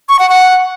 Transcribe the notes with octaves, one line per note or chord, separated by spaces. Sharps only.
C#6
F#5
F#5